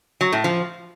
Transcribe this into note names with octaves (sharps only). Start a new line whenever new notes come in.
F#3
A2
F3